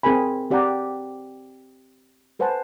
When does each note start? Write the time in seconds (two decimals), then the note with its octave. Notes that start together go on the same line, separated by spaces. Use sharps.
0.03 C4 G#4 A#4 G#5 B5
0.51 C4 G4 D5 F#5 G5 A#5
2.39 A4 B4 C5 F#5 G#5 A5